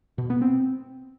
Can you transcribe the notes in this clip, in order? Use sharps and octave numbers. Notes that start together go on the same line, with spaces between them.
B2
B3
C4